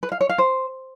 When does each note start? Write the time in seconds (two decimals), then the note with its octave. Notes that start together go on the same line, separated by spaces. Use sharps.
0.03 B4
0.12 F5
0.21 C#5
0.29 F5
0.38 C5